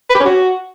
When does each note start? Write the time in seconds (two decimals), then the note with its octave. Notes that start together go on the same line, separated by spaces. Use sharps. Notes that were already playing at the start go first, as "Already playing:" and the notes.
0.10 B4
0.15 G4
0.20 C#4
0.26 F#4